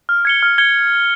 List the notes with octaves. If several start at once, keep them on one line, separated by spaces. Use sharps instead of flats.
F6
G#6 C#7 G7
F6
G#6 C#7 G7